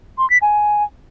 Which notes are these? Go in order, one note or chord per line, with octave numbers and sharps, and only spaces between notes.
C6
B6
G#5